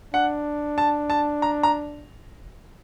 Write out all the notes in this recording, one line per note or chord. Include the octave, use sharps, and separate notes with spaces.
D4 F#5
A5
A5
A#5
A#5